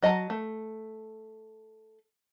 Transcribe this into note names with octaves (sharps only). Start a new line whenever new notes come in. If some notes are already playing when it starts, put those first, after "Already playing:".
F#3 D#5 A5 A#5
A3